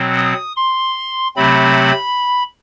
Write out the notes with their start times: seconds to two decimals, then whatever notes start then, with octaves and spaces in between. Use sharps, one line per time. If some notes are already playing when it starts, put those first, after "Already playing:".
Already playing: B2 F#3 C4
0.17 D#6
0.56 C6
1.36 C3 F#3 A3 C4 B5